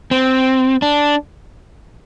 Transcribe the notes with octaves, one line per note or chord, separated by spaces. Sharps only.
C4
D4